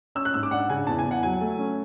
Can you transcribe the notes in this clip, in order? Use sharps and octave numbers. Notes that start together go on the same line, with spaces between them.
C#4 E6
F#6
G#2 E6
D6
D4 F#5
C#3 G#5
E2 A5
G#5
E2
F#5
F#3 G#5
A3
C#4